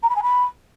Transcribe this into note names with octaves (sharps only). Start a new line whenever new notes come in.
A#5
B5
G#5
B5